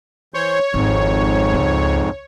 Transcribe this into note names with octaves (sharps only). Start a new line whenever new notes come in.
E3 C5 C#5 C6
G#1 F2 G#2
C#2